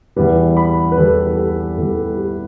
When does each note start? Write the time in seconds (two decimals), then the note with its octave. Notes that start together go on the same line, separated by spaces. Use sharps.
0.16 E2 E3 G3 B4
0.57 B5
0.92 B4
0.97 E2 E3 G3 A4
1.26 A4
1.37 G4
1.77 E2 E3 G3 A4
1.98 A4
2.17 G4